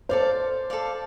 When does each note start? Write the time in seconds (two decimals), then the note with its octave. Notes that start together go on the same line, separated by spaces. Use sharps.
0.09 A4 C5 D5 F5
0.70 A4 D5 F5